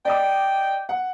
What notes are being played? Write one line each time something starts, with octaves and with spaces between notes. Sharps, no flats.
D5 D#5 G5 D6
F#5